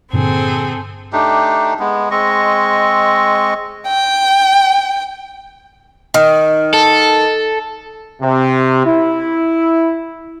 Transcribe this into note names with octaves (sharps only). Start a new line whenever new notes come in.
G2 A#2 D3 C4 G#4 A4
A3 D4 D#4 G4
G#3 B3
G#3 C4 D#5 C#6
G5
D#3
A4
C3
E4